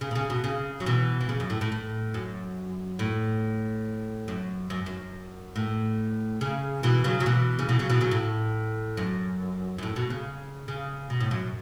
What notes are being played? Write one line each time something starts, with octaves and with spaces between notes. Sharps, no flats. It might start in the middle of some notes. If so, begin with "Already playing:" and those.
C#3
B2
C#3
B2
C#3
F#3
B2 E3
E3
C#3
F#2
A2
A2
A2
F#2
A2
F#2
F#2
F#2
A2
C#3
B2 E3
C#3 F#3
F#3
B2 E3
C#3
B2 E3
C#3 F#3
B2 E3
C#3 F#3
A2
F#2
F#2
A2
B2
C#3
C#3
B2
A2
F#2